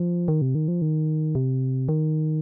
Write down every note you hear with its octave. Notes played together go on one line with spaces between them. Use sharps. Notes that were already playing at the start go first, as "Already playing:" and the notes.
Already playing: F3
D#3
C3
D#3
F3
D#3
C3
D#3